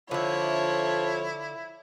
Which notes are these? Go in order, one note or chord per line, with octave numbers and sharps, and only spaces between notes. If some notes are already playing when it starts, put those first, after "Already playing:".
D3 F3 E4 C#5 E5